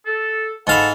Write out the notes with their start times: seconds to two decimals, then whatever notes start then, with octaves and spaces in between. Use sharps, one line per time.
0.06 A4
0.67 G#2 A4 F5 F#5 A5 B5